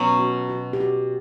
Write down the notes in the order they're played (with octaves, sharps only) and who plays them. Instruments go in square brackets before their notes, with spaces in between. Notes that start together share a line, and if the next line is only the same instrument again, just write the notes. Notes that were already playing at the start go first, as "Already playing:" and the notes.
Already playing: [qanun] B2 F#3 C#4
[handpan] F#4
F#4
G4
F#4